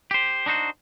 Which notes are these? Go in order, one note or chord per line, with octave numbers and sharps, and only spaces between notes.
G4 C5
D4 D#4 F#4 C5